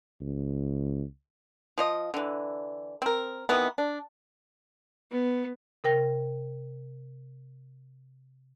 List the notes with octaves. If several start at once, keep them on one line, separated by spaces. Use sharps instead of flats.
C#2
F3 F4 D#5
D3 E3
C4 A#4
C3 D#3 E3 B3
D4
B3
C3 A#4 G5 A#6